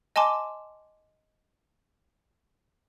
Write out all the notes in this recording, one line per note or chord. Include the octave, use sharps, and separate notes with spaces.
D#5 G#5 A5 C6 D6